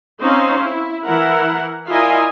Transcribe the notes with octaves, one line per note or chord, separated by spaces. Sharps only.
C4 C#4 D#4 C5 F5
E4
E3 E4 A#4 F#5
E4 F4 A#4 D5 D#5 G#5